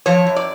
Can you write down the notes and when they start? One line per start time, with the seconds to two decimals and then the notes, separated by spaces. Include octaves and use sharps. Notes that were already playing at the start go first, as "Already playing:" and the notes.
0.06 F3 C#5
0.27 F#2
0.36 D5